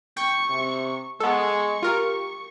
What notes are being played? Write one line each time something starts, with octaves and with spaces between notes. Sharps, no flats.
G5 C#6
C3
G#3 B3 A4 C#6
F4 G4 A#4